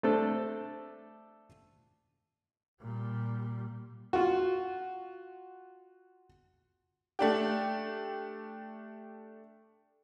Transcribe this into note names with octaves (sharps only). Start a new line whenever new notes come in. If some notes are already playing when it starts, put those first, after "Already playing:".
A3 C4 D4 A4
A#2 G3
F4 F#4
A3 D4 G4